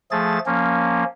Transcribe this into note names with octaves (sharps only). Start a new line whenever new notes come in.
F3 A3 G#4 A6
F3 A#3 C#4